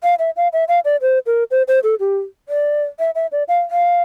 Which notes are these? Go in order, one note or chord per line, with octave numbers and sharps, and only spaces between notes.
F5
E5
F5
E5
F5
D5
C5
A#4
C5
C5
A4
G4
D5
E5
E5
D5
F5
F5